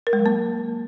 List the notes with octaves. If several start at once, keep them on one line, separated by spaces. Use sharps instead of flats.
A#4
G#3
F#3
A#3